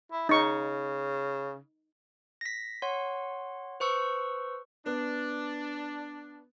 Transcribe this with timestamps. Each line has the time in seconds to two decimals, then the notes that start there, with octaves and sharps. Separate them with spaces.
0.12 E4
0.29 C#3 D#4 C#6
2.41 A#6 B6
2.82 C#5 F#5 C6
3.80 B4 C5 C#6 E6
4.86 B3 D4